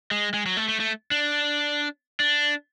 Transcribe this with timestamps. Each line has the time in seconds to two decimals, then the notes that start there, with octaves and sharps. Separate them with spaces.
0.11 G#3
0.34 G#3
0.46 F#3
0.57 A3
0.68 A3
0.80 A3
1.11 D4
2.20 D4